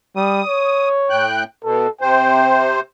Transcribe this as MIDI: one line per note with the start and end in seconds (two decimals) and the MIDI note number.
0.16 0.42 55
0.16 0.89 87
0.47 1.28 73
1.10 1.44 45
1.10 1.44 79
1.10 1.44 90
1.64 1.87 47
1.64 1.89 69
2.01 2.80 48
2.01 2.80 72
2.01 2.68 79